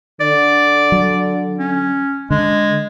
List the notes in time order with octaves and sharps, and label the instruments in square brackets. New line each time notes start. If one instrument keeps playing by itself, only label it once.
[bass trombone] D3 [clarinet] D5
[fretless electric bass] F#3
[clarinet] C#4
[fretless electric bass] D3 [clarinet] G#3